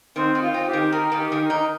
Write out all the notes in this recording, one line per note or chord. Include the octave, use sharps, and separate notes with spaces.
D#3 C4
D#3
F4
C4
G4
D#3
D#3 A#4
D#3
G4
D#3
A#4
D#4